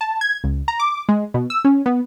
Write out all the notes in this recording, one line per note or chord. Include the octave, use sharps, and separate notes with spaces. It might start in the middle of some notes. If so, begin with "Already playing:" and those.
A5
G#6
C#2
A#5
D6
G#3
B2
E6
C#4
B3